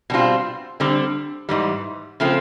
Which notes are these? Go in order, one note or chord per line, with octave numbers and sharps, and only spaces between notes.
B2 G3 C4 F4
D3 G3 C4
G#2 E3 G3
C#3 F3 A3 C4